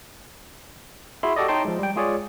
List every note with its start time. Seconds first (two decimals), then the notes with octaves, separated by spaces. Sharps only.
1.23 E4 F#4 G#4 E5 B5 C6
1.36 F#4 G4 A4 D5 D#5
1.48 D#4 C#5 G5 A5 C6
1.65 F3 G#3
1.79 G3 G5
1.96 G#3 F4 G#4 C#5 D5